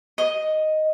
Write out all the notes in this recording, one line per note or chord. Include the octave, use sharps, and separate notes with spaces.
D#5